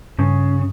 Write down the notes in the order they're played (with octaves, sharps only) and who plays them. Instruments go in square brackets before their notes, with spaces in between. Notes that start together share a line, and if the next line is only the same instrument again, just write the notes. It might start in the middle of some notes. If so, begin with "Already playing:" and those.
[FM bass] G2 [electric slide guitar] C#3